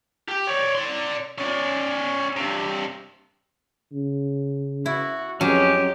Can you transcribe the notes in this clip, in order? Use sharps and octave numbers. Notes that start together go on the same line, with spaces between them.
G4
C#5 D5
D5 C6
C#4 D5
G2 C3
C#3
E4 F#4
F2 F#3 G#3 C#4 G4